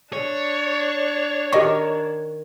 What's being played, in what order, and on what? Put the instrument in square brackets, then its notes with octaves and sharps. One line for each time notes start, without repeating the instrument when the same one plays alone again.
[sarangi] D4 [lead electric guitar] C#5
[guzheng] D#3 [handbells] G4 D#5 C#6